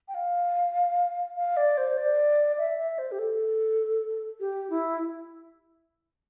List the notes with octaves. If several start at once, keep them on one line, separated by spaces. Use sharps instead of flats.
G5
F5
F5
D5
C5
D5
E5
E5
C5
G4
A4
G4
E4